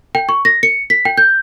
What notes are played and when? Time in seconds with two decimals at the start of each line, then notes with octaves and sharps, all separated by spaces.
0.15 G5
0.29 C#6
0.45 A#6
0.63 C#7
0.90 B6
1.05 G5
1.18 G6